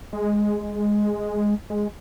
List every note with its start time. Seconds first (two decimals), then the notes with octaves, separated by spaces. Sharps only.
0.13 G#3
1.70 G#3